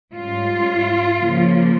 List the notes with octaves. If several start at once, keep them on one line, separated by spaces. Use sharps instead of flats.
G#2 G3 C#4 F4
C#3 F3 A#3